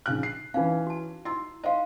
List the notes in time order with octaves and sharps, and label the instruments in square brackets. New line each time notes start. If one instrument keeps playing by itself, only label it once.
[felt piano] A#1 C#3 F#6
C7
[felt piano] E3 C#4 [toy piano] D#4 B4 F5
[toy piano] F#4 A5
[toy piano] E4 D#5 E6 [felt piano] C6
[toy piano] C5 F5 [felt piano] D#5 C6